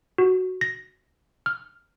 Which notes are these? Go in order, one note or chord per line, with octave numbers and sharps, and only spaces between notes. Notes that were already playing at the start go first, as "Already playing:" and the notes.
F#4
A#6
F6